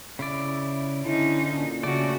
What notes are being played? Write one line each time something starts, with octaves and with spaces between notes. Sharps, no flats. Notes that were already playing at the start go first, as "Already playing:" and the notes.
C#3 E4 D5
D3 C#4 D#4 E4
A#2
C#3 A3 F#4 D5